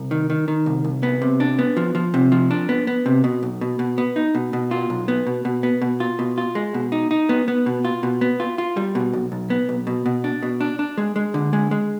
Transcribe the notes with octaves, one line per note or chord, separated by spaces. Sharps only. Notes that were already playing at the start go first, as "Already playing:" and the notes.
Already playing: C2
D#3
D#3
D#3
C2
C2
B3
C3
D4
B3
F3
F3
C3
F3
D4
B3
B3
C3
B2
B1
B2
B2
B3
D#4
B2
B2
F4
B1
B3
B2
B2
B3
B2
F4
B2
F4
G#3
B2
D#4
D#4
B3
B3
B2
F4
B2
B3
F4
F4
G3
B2
B1
B1
B3
B1
B2
B2
D4
B2
D4
D4
G#3
G#3
D3
G#3
G#3